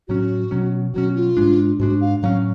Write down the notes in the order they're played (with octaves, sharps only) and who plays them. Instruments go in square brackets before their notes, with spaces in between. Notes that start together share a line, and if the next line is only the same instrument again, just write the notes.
[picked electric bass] A2 F#3 C#4 [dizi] F#4
[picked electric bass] B2 F#3 C#4
[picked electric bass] B2 F#3 C#4 [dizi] F#4
[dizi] F4
[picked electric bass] G#2 G#3 D4
[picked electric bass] G#2 G#3 D4 [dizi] F#4
[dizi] F5
[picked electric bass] A2 F#3 C#4 [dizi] F5